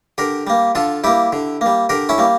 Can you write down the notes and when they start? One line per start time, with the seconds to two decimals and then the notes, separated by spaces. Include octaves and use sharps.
0.18 D3 G4 A#4
0.47 G3 A#3
0.75 D3 F4 A4
1.04 G3 A#3 E4 G4
1.33 D3
1.61 G3 A#3
1.89 D3 G4 A#4
2.09 C#4 E4
2.18 G3 A#3